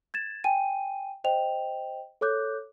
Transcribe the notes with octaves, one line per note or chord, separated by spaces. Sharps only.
G#6 A6 E7
G5 G#5 D#7
C5 D#5 G5 F7
A4 C#5 D6 F#6 G6